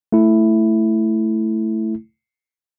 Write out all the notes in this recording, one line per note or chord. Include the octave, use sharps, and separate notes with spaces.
A3 E4